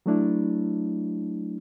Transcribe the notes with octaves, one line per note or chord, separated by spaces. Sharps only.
F#3 A3 D4 E4